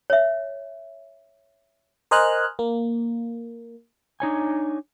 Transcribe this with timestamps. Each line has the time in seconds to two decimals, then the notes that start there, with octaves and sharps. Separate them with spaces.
0.10 C#5 E5
2.11 A#4 C5 D#5 G#5 F6 F#6
2.59 A#3
4.20 D4 D#4 C#5 G#5